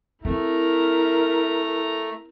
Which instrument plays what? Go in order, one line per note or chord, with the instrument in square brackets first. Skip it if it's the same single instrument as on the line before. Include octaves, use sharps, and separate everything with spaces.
[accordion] A3 [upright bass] C4 [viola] E4 A#4 [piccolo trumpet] A#5